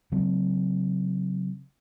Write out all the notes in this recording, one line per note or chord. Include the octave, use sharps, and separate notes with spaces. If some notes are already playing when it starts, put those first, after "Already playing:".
C#3 F#3 C4